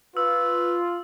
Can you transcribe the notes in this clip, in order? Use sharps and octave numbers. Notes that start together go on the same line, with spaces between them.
F4 B4 E6